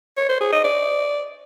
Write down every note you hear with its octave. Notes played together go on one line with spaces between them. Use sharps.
C#5
C5
G#4
D#5
D5